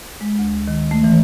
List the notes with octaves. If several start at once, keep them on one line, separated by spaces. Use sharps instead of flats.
G#3
D2
D#3
A3
E3